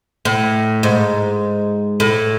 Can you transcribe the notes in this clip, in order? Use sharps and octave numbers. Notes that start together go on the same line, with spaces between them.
A2
G#2
A2